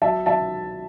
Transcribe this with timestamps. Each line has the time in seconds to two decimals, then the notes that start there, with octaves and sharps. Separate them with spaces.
0.02 F#3 E5 A5
0.26 F#3 E5 A5